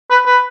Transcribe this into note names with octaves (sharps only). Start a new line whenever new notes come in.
B4
B4